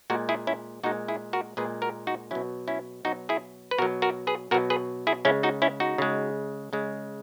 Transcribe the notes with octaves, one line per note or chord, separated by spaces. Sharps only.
A#2 G#3 F#4 A#4
E4 G#4
C#4 E4
A#2 G#3 D#4 F#4
E4 G#4
F#4 A#4
A#2 G#3 G#4 B4
F#4 A#4
D#4 F#4
B2 F#3 C#4 E4
C#4 E4
B2 F#3 D#4 F#4
E4 G#4
B4
B2 F#3 F#4 A#4
F#4 A#4
G#4 B4
B2 F#3 F#4 A#4
G#4 B4
E4 G#4
C#3 G#3 C#4 E4
D#4 F#4
C#4 E4
D#4 F#4
C#3 G#3
C#3 G#3